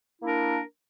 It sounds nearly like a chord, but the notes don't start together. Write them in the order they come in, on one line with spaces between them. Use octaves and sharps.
E4 A#3 D4 A#4